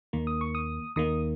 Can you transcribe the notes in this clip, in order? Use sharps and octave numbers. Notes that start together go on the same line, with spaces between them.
D#2 D#3 A#3
D#6
C#6
D#6
D#2 D#3 A#3 D#6